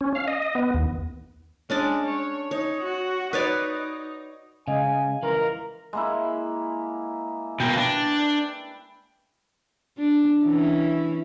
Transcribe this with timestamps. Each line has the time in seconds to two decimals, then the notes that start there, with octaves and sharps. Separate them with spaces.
0.01 C#4
0.15 F5
0.28 D#5
0.55 B3
0.74 D#2
1.70 G#3 C#4 D4 D5
2.06 C#5
2.51 D#4 C#5
2.83 F#4
3.33 D#4 B4 C#5 D5
4.67 C#3 G#3 D#5 F5 G#5
5.23 E3 F4 A#4
5.93 G#3 A#3 E4
7.60 B2 A#3 B4 G5
7.78 D4
9.98 D4
10.43 E3 C#4 E4